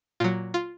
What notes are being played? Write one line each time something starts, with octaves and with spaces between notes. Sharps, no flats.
A#2 F#3 F4
F4